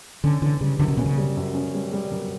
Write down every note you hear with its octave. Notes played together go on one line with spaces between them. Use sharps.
D3 C#4
D3 E3
C#3 G3
F#2 D3
C#3
B2 C#4
C#3
G3
F#2
C#4
G3
G3
F#2